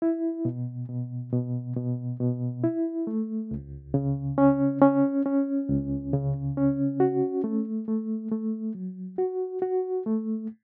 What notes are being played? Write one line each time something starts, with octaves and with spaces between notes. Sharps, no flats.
E4
B2
B2
B2
B2
B2
E4
A3
C#2
C#3
C#4
C#4
C#4
C#2
C#3
C#4
F#4
A3
A3
A3
F#3
F#4
F#4
A3